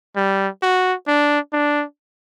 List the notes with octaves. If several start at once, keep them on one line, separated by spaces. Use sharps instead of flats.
G3
F#4
D4
D4